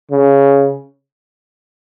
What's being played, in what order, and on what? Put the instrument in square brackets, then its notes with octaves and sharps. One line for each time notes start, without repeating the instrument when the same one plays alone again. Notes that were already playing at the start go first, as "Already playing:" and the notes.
[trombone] C#3